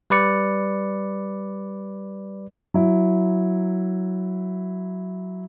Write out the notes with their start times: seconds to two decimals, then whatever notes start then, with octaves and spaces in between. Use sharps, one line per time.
0.10 G3 B4 D5 C#7
2.74 F#3 E4